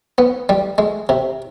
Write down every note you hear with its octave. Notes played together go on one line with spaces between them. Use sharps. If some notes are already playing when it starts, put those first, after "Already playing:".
B3
G3
G#3
C3